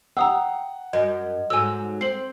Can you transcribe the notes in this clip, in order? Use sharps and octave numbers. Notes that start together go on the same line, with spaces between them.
F#5 G5 A#5 D#6 E6
F#2 D#5
G#2 F#3 A4 G#5 E6
C4 C7 F#7